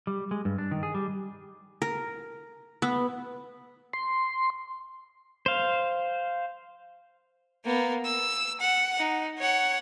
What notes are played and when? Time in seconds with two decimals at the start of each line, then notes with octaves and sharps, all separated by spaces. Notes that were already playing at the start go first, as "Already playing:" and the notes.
0.07 G3
0.31 G#3
0.45 G2
0.58 D4
0.71 D#3
0.83 G#4
0.94 G3
1.82 A#4
2.82 B3
3.93 C6
5.46 C5 F5
7.65 A#3 B3
8.05 E6
8.61 F#5
8.98 D#4
9.39 C#5 F#5